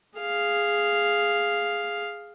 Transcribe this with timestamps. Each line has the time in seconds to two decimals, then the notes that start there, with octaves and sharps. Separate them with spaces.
0.19 G#4 F5